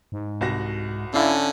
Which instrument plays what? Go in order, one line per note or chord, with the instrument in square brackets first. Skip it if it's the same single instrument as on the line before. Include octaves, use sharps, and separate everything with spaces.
[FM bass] G#2
[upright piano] C2 F#4 A#6
[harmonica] D3 [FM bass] C#4 [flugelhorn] E4 [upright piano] D5 F5